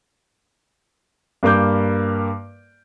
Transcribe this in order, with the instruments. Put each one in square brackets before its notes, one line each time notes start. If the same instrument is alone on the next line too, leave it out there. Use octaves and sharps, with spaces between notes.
[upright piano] G2 A#3 A#4 D6 G6